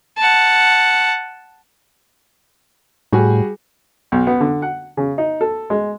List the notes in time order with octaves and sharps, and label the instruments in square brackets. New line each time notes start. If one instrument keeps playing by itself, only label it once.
[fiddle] F#5 A5
[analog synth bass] A2 [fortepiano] G3 F#4 G#4
[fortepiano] B1
B3
D3
F#5
C#3
D#4
A4
G#3